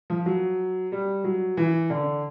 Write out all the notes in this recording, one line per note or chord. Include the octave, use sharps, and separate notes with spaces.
F3
F#3
G3
F#3
E3
D3